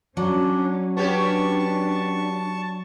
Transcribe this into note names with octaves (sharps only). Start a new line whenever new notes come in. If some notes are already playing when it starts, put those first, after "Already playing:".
F#3 C#4 D4
B3 C#4 D4 G4 A5 C#6